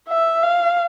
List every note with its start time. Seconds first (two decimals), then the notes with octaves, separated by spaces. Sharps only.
0.08 E5
0.43 F5